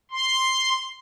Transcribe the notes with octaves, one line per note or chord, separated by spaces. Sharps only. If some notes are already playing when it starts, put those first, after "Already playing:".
C6